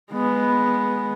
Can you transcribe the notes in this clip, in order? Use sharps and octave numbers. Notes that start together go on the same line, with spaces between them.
G#3 B3